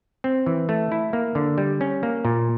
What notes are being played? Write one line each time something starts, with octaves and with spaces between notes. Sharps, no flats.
C4
E3
A3
E4
A#3
D3
G3
C#4
A#3
A#2